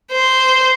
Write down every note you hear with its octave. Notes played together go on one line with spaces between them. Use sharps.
C5